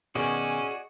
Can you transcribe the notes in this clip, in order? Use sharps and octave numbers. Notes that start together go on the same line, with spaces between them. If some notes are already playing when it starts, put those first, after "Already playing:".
B2 D#3 C#4 F#4 G#4 D5 D#5